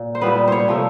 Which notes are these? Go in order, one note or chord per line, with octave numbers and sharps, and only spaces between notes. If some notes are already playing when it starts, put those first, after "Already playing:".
Already playing: A#2
C5
A#2 G3 B3 B4
C5 C#5
C3 F3 A3